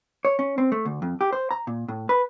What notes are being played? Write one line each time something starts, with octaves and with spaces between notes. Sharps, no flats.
C#5
C#4
C4
A3
D2
F2
G4
C5
A#5
A#2
A2
B4